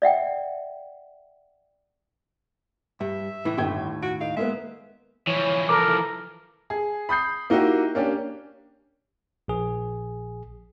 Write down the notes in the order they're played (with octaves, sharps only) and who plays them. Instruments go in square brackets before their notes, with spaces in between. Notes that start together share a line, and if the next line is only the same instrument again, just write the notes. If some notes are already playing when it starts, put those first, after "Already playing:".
[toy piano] D5 E5 F#5 G5
[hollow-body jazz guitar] G2 [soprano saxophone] E5
[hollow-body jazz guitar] A2 E3 E4
[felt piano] G1 G5 G#6 [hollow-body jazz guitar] D#2 A2
[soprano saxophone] F#4 [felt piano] D7
[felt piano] D#4 [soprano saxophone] F5
[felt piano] G#3 A#3 B3 [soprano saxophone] E5
[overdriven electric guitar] E3 F3 [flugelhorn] C#5
[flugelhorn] A4 [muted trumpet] A#4 [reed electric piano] D6
[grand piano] G#4
B5 D#6 G6 C7
A#3 D#4 E4 F#4 G4
A#3 C#4 D4 G4
[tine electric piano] A#1 G#4